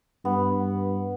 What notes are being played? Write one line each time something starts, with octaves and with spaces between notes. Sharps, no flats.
G2 B3